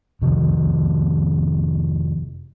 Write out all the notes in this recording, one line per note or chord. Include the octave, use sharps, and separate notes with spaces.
F2 C3 D#3 F3